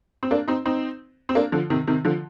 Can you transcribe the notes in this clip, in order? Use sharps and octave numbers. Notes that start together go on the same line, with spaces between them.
C4
A#3 D4
C4 D#4
C4 D#4
C4
A#3 D4
D3 F3
C3 D#3
C3 D#3
D3 F3